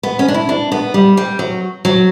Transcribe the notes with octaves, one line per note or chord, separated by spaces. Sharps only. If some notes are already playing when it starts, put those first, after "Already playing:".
B3
C#4
D4
E4
D4
B3
G3
G3
F#3
F#3